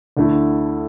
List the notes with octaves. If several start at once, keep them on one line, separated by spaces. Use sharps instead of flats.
D2 D3 A3 E4